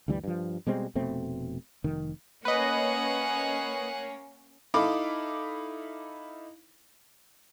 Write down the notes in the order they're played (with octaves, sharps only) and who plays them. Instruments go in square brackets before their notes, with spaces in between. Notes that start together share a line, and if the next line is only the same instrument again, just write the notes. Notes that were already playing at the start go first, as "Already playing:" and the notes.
[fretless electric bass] D2 G2 E3 G3
G2 F3
B2 G3 G#3 C4
F1 B2 A3 C4
F1 D#3
[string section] A#3 C#4 C#5 [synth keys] B4 D#5 [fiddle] F#5 G#5
[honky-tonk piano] D#4 E4 A4 F5 B5 D6